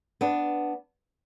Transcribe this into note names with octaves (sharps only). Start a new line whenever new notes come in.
B3 D4